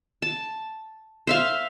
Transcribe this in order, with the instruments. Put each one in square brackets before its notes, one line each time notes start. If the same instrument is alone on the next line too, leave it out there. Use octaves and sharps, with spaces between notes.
[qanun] A5
C5 E5 F5